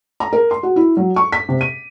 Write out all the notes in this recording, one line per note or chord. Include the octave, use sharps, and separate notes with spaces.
A#5
A#4
C6
F#4
E4
F#3
C#6
B6
C3
D#7